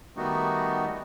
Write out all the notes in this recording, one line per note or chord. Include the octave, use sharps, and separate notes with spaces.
D#3 G3 A3 B3 D#4 F#4